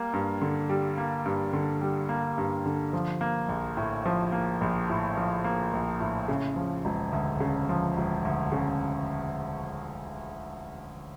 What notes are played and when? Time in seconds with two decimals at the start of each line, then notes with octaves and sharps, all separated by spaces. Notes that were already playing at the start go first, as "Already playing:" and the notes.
Already playing: G3 A#3
0.13 G2
0.42 D3
0.69 G3
0.97 A#3
1.26 G2
1.53 D3
1.81 G3
2.09 A#3
2.38 G2
2.66 D3
2.93 F3
3.21 A#3
3.49 A#1
3.77 A2
4.06 F3
4.32 A#3
4.61 A#1
4.89 A2
5.17 F3
5.44 A#3
5.73 A#1
6.00 A2
6.28 C#3
6.56 F3
6.85 E1
7.13 D2
7.40 C#3
7.69 F3
7.97 E1
8.25 D2
8.52 C#3